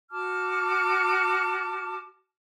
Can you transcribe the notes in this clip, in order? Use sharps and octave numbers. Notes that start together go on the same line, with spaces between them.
F#4 A5 D6 F6